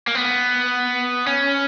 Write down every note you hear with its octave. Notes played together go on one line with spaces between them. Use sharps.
A#3
B3
C#4